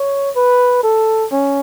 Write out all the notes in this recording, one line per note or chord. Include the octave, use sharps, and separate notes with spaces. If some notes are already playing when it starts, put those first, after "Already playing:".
Already playing: C#5
B4
A4
C#4